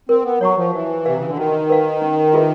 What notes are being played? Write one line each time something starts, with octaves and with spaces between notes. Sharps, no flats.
C4 A#4
B3
F#3 C#5 F#5 A#5 C#6
F3
E3 F#4
C3 B4 D5 F5
C#3
D3
D#3 F#4
B4 D5 F5
C#4
F4 G#4 B4 E5